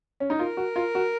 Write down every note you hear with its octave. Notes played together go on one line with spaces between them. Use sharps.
C#4
D#4
F4 A#4
F#4
F4
F#4